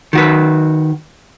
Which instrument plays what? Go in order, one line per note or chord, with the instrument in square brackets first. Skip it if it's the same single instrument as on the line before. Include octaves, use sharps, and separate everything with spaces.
[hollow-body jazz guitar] D#3 F#4 B4